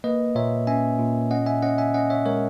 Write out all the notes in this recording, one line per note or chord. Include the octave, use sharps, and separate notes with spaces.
A#3 B4 D#5
A#2 C#5 E5
C#4 E5 G#5
A#2
C#4 D#5 F#5
E5 G#5
C#4 D#5 F#5
E5 G#5
C#4 D#5 F#5
C#5 E5
G#3 A#4 C#5